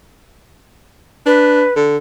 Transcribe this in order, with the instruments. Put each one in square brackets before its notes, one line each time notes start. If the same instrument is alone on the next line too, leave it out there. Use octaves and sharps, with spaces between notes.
[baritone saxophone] D4 [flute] B4
[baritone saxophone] D3